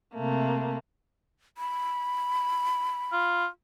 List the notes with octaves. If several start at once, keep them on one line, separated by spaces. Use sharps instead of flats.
C3 A3 A#3
B5
F4